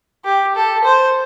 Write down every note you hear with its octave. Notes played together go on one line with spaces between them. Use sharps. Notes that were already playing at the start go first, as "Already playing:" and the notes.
G4
A4
C5